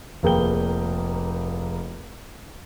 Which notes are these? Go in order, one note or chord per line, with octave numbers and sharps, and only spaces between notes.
F1 A#3 G#4 B4 G5 G7